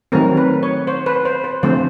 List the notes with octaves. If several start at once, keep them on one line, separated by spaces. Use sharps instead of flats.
D#3 F#3 A3 C4 A#4
B4
C#5
C5
B4
C5
C5
D3 F3 A3 C4 C5